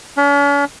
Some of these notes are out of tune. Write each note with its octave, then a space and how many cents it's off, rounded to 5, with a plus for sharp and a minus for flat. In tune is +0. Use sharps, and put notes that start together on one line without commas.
C#4 +45